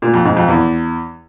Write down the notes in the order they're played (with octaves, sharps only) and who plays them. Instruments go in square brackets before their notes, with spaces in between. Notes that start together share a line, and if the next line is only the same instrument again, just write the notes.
[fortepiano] A#2
F2
G#2
F2
E2